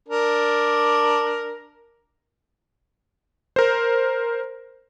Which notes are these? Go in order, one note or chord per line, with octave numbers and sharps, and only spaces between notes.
D4 A#4
A#4 C5